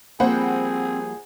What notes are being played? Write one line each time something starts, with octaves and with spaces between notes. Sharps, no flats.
F3 G3 A#3 C4 G#4 C5 F#5 B5